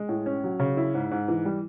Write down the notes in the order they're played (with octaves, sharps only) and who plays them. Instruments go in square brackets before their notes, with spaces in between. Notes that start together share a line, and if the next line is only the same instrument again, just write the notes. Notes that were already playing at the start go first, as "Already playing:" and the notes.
Already playing: [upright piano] G#3
A2
C#4
F#3
C#3
E4
G#2
G#2
E3
G3